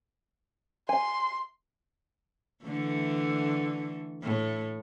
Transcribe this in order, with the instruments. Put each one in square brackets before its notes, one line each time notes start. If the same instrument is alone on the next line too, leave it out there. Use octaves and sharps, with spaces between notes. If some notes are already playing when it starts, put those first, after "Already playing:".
[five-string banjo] G#5 [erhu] C6
[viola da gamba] D3 E3 A3
A2